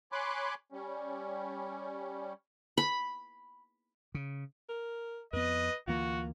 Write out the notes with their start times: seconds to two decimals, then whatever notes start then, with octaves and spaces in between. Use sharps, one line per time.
0.12 C#5 G#5 B5 C6 D6 F#6
0.72 G3 C#4
2.78 B5
4.15 C#3
4.69 A#4
5.33 F2 B3 B4 D#5
5.88 D2 E3 A#3 F4 F#4